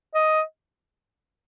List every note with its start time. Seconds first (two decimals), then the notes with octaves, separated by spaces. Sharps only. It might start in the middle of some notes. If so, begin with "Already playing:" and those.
0.15 D#5